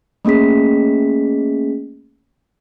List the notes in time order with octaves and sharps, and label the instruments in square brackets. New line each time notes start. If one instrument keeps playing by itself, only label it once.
[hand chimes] A3 A#3 C#4 G#4 B6